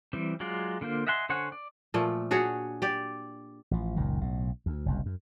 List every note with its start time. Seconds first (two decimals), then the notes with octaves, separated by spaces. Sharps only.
0.13 E3 G3 C4
0.40 F#3 G#3 F4 D5
0.81 D3 A#3 F4 C5
1.07 D#5 E5 F#5 G#5 C6
1.29 D3 C5 C#5 F#5 G#5
1.52 D5
1.94 A#2 F3 A3
2.31 D4 F#4 G#4 C#5
2.82 G4 D5
3.71 A1 F3
3.96 F#1 C#2 A#2 D#3
4.21 B1 A2
4.66 D2
4.86 F#1 C2 F#2
5.06 F#2